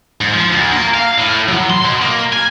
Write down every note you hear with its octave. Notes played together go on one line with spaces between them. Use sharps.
G#2
F3
D2
A#3
F5
A2
F#3
C6
B2
A#3
G#5